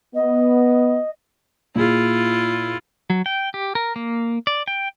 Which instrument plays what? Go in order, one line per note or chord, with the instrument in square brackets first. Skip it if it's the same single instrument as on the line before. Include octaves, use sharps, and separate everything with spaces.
[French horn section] B3 [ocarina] D#5
[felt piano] A#2 G#4 [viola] E4 F4
[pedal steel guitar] F#3
G5
G4
A#4
A#3
D5
G5